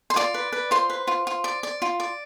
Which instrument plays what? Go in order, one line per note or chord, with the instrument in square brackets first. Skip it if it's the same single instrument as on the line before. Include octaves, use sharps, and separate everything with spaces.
[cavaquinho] C6
F4 D5 D6
B4
B4
F4 C5 C6
B4
F4
F4
D5
D5
F4
D5